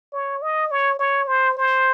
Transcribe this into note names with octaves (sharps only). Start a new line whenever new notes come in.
C#5
D#5
C#5
C#5
C5
C5